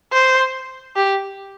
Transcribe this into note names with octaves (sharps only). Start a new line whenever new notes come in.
C5
G4